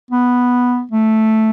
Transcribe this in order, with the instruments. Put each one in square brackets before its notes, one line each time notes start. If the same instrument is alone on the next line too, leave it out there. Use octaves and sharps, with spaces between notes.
[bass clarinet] B3
A3